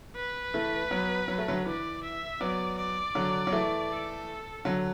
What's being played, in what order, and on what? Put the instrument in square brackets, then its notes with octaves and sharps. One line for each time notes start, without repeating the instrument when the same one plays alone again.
[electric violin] B4
[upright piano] E3 A3
F#3 B3
F#3
A3
D3 F#3
[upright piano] E3 [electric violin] D5
[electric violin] E5
[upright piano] F#3 B3 [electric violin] D5
[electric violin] D5
[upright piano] D3 F#3
F#3
E3 A3
[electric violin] A4
[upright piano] D3 F#3